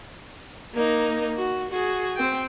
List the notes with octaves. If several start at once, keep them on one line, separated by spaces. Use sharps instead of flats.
A#3 D#4
F#4
F#4 G#4
C4 G5